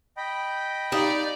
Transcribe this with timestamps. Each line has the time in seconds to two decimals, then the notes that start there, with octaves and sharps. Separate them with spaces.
0.17 D#5 G5 B5
0.92 D#4 G4 D5 F5